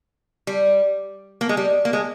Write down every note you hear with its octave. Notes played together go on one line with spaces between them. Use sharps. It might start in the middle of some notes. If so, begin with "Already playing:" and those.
G3
A#3
G#3
G3
A#3
G#3